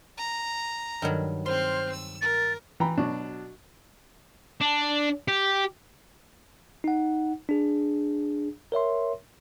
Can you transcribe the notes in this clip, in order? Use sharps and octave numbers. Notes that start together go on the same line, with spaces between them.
A#5
G2 D#3 F#3
C4 C5 C6 F6
E6
A#4 A6
E3 G5 A#5 B5
B2 F#3 D4
D4
G4
D#4 F#5
D4 G#4
A#4 C#5 E5 C6